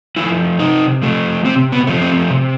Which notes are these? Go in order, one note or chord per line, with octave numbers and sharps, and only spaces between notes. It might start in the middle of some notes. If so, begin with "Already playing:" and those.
F3 A3 E4
C3 D#4
F3 A3
C3 C4
B3
F3 A3
C4
C3